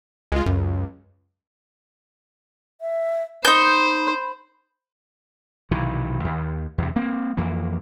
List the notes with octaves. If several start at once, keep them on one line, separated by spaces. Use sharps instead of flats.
C#2 G#3 F4
C#2 F#2
E5
D#4 C5 B5 G6
B1 C3 D#3 E3
D#2
E2 C3
A#3 C4
F2 E3 A#3